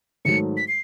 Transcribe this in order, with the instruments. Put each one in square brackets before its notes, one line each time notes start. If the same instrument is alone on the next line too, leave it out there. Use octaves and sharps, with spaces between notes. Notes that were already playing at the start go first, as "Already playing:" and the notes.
[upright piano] G#2 D#3 F#3 A3 [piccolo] C#7
[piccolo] B6
C7